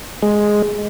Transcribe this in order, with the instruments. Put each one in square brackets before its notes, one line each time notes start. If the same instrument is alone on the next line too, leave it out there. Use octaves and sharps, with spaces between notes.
[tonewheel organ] G#3